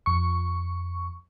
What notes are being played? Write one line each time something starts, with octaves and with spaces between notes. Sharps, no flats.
F2 C#6